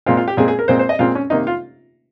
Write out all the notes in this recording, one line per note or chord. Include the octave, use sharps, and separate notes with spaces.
A#2 G#3 C4 F4
F4
G4
A#2 G#3 C4 G#4
G#4
A#4
A#2 G#3 C4 C5
C5
D#5
A#2 G#3 C4 F4
C#4
C3 D#3 A#3 D#4
F4